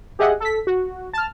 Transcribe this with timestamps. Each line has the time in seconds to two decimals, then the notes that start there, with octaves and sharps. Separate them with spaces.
0.19 G4 G#4 D#5 E5 F#5
0.41 A4 B6
0.67 F#4
1.13 A5 F6